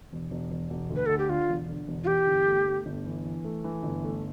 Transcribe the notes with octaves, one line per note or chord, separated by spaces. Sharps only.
E1
E1
E1
E1
D2
B4
D2 A4
G4
D3 F4
E1
D3
E1
F4
E3 G4
G1
A3
A3
G1
E3
E3
A3
E3
G1
A3